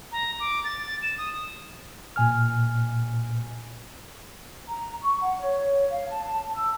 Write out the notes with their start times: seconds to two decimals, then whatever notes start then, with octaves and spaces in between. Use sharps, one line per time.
0.12 A#5
0.40 D6
0.65 A6
1.02 E7
1.18 D#6
2.16 A#2 G#5 F6
4.67 A#5
5.01 C#6
5.20 F#5
5.39 C#5
5.90 F5
6.07 A5
6.23 A5
6.54 E6